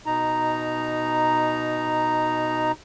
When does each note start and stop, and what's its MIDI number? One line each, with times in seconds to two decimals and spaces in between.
0.06 2.72 47
0.06 2.72 63
0.06 2.72 82